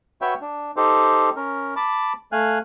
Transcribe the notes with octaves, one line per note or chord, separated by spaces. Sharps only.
F#4 B4 C#5 E5 G5
D4
D#4 G4 A4 C5
C#4 A#4
A5 B5 D6
A3 F5 G#5 F#6